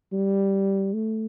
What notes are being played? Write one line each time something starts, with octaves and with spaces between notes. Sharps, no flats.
G3
A3